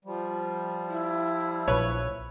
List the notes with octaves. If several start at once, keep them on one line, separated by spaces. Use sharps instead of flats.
F3 G3
E4
A#1 B4 C#5